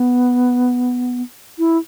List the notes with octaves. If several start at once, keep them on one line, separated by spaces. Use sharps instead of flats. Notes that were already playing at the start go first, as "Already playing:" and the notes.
Already playing: B3
E4